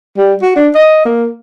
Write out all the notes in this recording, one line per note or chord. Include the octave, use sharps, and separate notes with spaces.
G3
F#4
D4
D#5
A#3